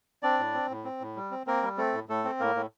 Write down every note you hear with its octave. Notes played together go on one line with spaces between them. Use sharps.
C4 D4 D5
A2
C4
A2
C4
A2
G3
C4
A#3 C4 A#4
G3
A3 C4 A4
A2
A2 A3 A4
C4
A2 A#3 A#4
A2